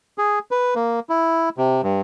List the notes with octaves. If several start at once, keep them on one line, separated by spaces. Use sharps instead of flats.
G#4
B4
A#3
E4
C3
G2